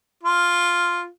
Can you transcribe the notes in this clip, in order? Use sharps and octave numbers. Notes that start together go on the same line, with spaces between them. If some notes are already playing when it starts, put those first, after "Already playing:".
F4